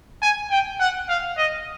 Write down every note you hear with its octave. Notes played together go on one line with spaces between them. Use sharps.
G#5
G5
F#5
F5
D#5